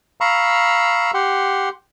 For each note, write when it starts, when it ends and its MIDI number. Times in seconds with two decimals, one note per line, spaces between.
0.21 1.11 77
0.21 1.11 82
0.21 1.11 83
0.21 1.11 85
0.21 1.11 88
1.14 1.69 67
1.14 1.69 78
1.14 1.69 84